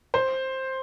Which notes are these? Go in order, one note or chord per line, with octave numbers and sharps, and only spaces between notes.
C5